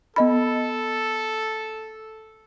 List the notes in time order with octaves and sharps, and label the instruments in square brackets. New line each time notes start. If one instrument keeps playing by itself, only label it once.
[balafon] B3 D#5 B5 [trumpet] A4